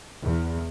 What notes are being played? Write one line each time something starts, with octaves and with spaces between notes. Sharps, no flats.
E2